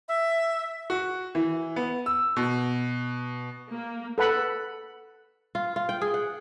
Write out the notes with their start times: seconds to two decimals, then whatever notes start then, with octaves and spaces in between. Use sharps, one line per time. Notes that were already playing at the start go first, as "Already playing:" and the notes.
0.09 E5
0.90 F#4
1.35 E3
1.76 B3
2.06 E6
2.36 B2
3.71 A#3
4.18 A4 B4 F#5 B5
5.55 F4
5.76 F4
5.89 G5
6.02 G#4
6.14 F#5